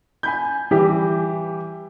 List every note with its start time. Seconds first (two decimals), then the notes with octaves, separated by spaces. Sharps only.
0.23 G#5 B5 G6
0.71 E3 G3 G4